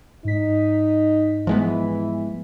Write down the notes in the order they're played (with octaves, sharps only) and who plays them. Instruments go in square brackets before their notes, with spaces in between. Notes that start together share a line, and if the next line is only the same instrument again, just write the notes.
[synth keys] G#2 B6 [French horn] D#4
[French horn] E3 [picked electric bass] F3 G#3 B3